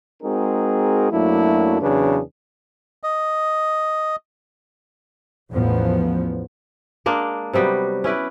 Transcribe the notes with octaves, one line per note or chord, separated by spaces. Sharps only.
G#3 C4 D#4 F#4 G#4 A#4
F#2 F#3 A3 A#3 D4 E4
E2 C#3 F#3 D4 G#4 B4
D#5
A1 E2 F3 B3
G#3 A#3 D4
C3 F#3 G3 B3
C#4 E4 B4 D5